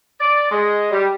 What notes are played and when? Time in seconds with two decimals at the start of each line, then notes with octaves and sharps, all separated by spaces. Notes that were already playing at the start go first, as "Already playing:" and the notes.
0.21 D5
0.52 G#3
0.91 G3